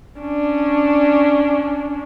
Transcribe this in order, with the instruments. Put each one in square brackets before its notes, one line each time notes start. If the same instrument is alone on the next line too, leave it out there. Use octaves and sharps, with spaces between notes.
[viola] C#4 D4